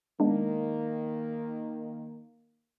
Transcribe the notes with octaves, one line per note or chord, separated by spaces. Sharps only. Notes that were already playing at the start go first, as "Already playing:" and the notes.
D#3 G#3 A#3 B3 D4